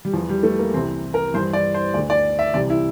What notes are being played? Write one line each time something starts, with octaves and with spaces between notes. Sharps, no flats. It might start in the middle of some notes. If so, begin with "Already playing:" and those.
G3
E2 E3 F3
G3
A3
A#3
C2 C3 E3 C4
A#4
G2 E3 C5
D5
C5
D2 D3 D5
D5
E5
C2 C3 E3 D5
E4